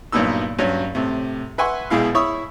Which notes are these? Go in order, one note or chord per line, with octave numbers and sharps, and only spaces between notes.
G2 A#2 F#3 B3 D#4 E6
G2 F#3 C#4
A2 C3
B4 E5 F#5 G#5 C6 C#6
B1 B2 G#3 E4 F5
E4 C#5 E5 B5 C#6 D#6